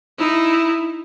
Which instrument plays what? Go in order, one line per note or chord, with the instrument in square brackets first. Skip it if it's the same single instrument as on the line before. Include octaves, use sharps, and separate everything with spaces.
[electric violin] D#4 E4